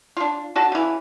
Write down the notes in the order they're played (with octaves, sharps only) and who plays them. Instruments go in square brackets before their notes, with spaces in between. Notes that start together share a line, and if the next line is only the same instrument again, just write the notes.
[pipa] D4 F4
D3 F#4 A5
C#3 E3